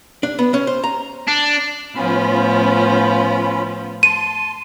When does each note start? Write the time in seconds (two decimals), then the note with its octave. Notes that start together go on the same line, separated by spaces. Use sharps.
0.23 D4
0.39 B3
0.54 C#4
0.67 C5
0.84 A#5
1.28 D4
1.96 A2 F3 B3 C#4 F4 B5
4.03 A5 C6 D#7